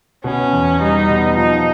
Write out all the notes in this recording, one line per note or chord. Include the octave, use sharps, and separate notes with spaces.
B2 C#4
E2
G3 D#4
B2
F3 D#4